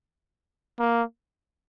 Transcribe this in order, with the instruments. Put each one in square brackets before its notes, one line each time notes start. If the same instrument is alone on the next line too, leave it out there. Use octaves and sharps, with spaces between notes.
[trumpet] A#3